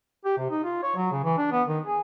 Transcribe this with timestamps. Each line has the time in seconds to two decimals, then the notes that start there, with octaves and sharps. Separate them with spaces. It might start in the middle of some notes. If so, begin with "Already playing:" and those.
0.25 G4
0.38 C3
0.50 D#4
0.64 F4
0.82 C#5
0.96 F#3
1.12 C#3
1.24 E3
1.38 D4
1.52 B3
1.68 D#3
1.86 G#4